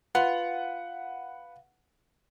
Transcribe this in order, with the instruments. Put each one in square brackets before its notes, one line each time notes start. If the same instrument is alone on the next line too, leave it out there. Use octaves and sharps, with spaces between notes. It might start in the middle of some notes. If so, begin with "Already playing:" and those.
[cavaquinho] F4 [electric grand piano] B4 F#5